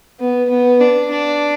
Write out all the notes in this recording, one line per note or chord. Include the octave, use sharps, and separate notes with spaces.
B3
B3
D4
D4